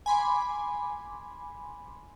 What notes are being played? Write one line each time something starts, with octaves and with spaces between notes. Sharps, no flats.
G#5 B5 C6 D6